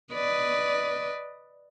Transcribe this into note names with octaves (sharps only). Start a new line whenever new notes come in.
B4 D5 D#5